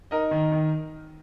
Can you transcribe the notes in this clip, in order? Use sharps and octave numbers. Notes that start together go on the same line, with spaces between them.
D#4 A#4 D#5
D#3
D#3